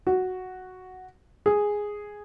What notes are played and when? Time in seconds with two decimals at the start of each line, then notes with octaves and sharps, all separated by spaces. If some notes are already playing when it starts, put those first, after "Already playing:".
0.07 F#4
1.46 G#4